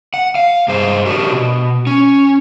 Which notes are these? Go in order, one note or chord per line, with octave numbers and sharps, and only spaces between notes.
F#5
F5
G2 G#4 C5
D4 F#4 G4 A#4
B2
C#4